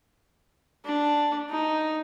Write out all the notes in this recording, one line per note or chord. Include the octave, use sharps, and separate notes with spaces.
D4
D#4